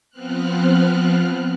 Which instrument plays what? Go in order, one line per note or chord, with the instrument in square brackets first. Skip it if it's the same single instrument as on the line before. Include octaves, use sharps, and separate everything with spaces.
[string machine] F3 B3 C4 F6 F#6